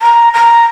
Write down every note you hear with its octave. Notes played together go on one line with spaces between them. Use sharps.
A#5
A#5